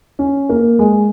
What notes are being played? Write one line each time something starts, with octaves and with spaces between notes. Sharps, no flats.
C#4
A#3
G#3